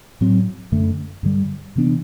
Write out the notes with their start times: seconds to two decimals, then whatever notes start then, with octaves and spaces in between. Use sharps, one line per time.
0.21 A2 F#3 C4
0.72 F#2 D3 A3
1.23 G2 D3 G3
1.76 C3 E3 B3 D4